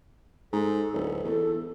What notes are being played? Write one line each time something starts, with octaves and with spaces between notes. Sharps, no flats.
G#2 A4
D1
E2 A4